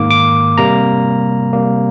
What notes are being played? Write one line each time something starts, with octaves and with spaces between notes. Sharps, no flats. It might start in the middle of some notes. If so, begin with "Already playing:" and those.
Already playing: G#2 D#3 A#3 D6
D6
C3 G3 A#3 A#5
C3 G3 A#3